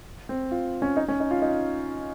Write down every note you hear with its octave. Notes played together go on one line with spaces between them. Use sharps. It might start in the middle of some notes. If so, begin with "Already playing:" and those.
C4
F4
C#4
D#4
C#4
D#4
F4
D#4